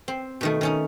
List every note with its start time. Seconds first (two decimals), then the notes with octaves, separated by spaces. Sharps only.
0.08 C4
0.41 B2 D#3 A3
0.61 D#3 C#4 D#4